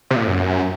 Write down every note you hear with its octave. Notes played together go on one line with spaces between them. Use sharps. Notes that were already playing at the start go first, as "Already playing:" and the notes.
C3
A#2
A2
F#2